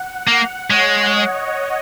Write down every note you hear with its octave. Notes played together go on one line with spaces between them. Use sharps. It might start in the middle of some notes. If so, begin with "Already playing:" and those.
Already playing: F#5
A#3
G#3 C#5
D#5